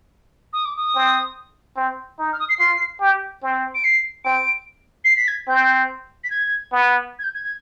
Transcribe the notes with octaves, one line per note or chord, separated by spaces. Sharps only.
D#6
D6
D#6
C4
C4
D#4
F6
D#6
C7
F4 C7
G4
C4
D7
C7
C4 D7
C7
B6
G#6
C4 G6
B6
G#6
B3
G#6
G6
G#6
G#6